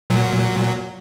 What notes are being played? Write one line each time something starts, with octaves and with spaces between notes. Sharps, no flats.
A#2 F#3